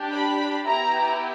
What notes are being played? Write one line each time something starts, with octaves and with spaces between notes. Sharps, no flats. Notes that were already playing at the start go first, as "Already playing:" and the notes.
Already playing: D4 G4
B5
B3 E4 G4 A#5